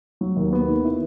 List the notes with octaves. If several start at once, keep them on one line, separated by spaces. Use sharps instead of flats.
F#3
D#2
B3
D#3
E4